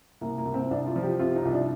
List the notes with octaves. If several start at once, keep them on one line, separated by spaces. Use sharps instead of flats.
C2 A#3
A#3
C2
C4
C2 D4
F4
F3
G4
C3 F4
D#4
C2
D4